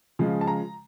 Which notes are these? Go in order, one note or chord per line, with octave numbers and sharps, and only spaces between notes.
C#3 F3 G#3
A5
A#5